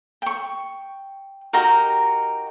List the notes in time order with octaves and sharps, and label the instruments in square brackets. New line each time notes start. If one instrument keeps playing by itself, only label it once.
[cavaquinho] G5 C#6
D#4 F#4 G4 A#4